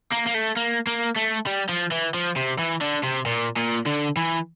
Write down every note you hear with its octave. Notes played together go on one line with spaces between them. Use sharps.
A#3
A#3
A3
A#3
A#3
A3
G3
F3
E3
F3
C3
E3
D3
C3
A#2
A#2
D3
E3